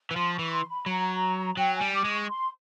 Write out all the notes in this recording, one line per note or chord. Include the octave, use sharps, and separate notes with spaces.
E3
F3 C6
C#6
E3
C6
B5
F#3 A#5
F#3 G5
G#5
G3
D6
G#3
C#6
C6